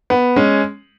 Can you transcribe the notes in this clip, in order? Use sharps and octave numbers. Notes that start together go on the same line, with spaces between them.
B3
G#3 C#4